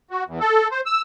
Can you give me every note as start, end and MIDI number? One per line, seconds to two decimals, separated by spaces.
0.11 0.24 66
0.27 0.40 40
0.40 0.68 69
0.71 0.81 72
0.86 1.02 88